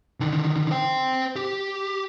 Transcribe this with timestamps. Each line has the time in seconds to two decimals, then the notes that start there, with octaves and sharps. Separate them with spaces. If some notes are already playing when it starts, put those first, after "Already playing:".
0.20 D3 D#3
0.71 C5 G5
1.36 G4